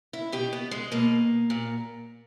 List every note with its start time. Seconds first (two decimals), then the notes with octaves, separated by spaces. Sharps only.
0.13 E4
0.32 B2 G4
0.53 B3
0.71 G#3
0.92 B2 A#3
1.50 A#2